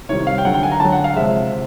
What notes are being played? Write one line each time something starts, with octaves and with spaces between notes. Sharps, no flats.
C3 D#3 G3 C#5
F5
G5
D3 F#3 F#5
G5
G#5
A#5
D3 F#3 A5
F#5
F5
C3 F3 G#3 E5
C3